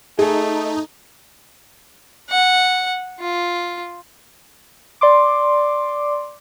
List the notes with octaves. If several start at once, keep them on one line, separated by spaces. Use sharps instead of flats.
A3 D#4 G#4
F#5
F4
D5 C6 D6